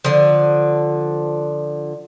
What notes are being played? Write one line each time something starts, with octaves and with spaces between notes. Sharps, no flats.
D3 F3